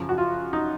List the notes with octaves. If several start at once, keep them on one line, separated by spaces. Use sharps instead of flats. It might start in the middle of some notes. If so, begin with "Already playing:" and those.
Already playing: F#2 C#3 F3
F#4
F4
D#4